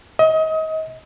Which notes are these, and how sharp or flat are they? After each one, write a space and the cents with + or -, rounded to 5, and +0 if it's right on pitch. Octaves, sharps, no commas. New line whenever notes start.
D#5 +30